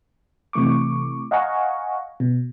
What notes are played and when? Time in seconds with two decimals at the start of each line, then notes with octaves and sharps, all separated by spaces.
0.53 C3 E3 A3 C#6 D6
1.31 D#5 F5 F#5 G#5 A#5 C#6
2.20 B2